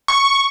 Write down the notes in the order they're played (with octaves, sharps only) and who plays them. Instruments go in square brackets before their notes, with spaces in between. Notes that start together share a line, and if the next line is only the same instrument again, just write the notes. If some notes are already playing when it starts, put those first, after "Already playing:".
[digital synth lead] C#6